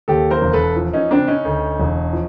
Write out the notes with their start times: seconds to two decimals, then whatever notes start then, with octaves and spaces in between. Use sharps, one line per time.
0.08 D#2 G4 A4
0.31 A#4 C5
0.42 E1
0.53 A4 B4
0.76 F3
0.94 C#4 D#4
1.11 C#3 C4 D4
1.28 C#4 D#4
1.45 D2
1.80 E1
2.13 F3